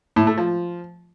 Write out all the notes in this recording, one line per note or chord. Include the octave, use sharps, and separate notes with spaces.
A2
A3
F3